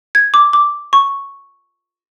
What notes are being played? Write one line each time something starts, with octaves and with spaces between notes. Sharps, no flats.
G#6
D6
D6
C#6